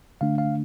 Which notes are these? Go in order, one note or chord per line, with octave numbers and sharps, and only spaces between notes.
D3 A3 D4 F5
F5